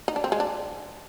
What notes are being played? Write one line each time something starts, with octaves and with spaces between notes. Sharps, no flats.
D#4
D4
C4
G#3
D4